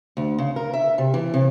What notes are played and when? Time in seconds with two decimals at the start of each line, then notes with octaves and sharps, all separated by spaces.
0.17 D2
0.38 C#3
0.56 A#4
0.73 E5
0.98 C3
1.14 E3
1.34 C3